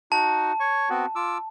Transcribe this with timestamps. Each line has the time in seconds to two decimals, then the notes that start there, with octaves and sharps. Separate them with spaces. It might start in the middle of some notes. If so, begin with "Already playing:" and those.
0.12 D#4 F#4 A5
0.60 C#5 C#6
0.89 B3 C4 F#4
1.15 F4 D6 E6